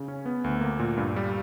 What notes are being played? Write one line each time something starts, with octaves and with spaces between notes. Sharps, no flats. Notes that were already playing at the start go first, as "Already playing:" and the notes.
Already playing: C#3
C#4
B3
D2
A#3
A#2
G2
G3